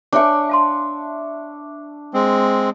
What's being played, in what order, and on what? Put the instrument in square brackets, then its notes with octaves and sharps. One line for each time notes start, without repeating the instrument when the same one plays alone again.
[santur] D4 E5 C#6 [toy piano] C#5 G#5 D6
[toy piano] F5 A5 C6
[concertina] G#3 C4